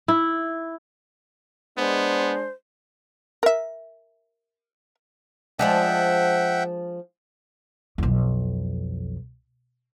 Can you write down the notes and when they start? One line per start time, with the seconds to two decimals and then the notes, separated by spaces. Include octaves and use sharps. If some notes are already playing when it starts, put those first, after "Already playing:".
0.08 E4
1.78 G#3 B3 D4 C5
3.43 A#4 E5
5.59 F3 G#3 D4 E5 F#5 G5
7.98 B1 F2